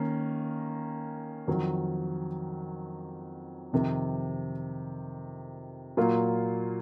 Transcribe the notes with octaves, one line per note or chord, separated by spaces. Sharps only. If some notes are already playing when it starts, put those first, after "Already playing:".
Already playing: D#3 A#3 C#4
F2 D#3 F#3
F2 C3 D#3
A#2 F#3 A#3 F4